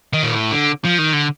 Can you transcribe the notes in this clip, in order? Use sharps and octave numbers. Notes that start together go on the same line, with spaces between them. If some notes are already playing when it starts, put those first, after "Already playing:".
D#3
A#2
A2
D3
F3
D#3
D3